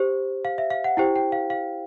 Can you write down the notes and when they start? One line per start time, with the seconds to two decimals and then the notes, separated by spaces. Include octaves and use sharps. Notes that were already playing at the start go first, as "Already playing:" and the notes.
Already playing: G4 C5
0.45 F5
0.58 E5
0.70 F5
0.84 F#5
0.97 E4 G4 C5 G5
1.16 G5
1.32 F5
1.50 F5